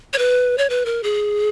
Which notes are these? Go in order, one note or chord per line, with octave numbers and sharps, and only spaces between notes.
C#5
B4
C#5
B4
A#4
G#4